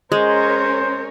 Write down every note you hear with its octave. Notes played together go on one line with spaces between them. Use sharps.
G#3 C#4 A#4 C5 C#5